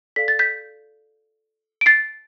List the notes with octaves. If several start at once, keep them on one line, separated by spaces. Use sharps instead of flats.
A4 D5 F5 B6
A6
G6 B6
D7
A6 C7